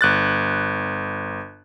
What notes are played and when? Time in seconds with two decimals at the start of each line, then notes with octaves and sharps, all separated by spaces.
0.01 G1 F#6 A6